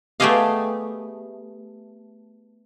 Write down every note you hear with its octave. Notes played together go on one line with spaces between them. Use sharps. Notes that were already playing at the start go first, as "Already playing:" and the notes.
A3 B3 G4 G#4 D#5 F5